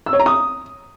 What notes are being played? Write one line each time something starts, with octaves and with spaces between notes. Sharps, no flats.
E6
C#5
A#5
D#6